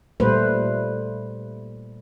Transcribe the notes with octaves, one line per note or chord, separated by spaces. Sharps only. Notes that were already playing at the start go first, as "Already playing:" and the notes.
A#2 G3 A3 B4 C5